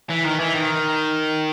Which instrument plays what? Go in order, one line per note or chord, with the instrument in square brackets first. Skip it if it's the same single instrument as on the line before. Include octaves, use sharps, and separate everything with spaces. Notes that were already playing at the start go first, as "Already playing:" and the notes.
[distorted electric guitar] E3
D#3
E3
D#3